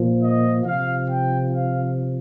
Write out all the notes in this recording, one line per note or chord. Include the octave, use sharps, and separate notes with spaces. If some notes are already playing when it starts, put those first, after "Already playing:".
Already playing: A#2 F3
D#5
C3 F3 F5
G5
F5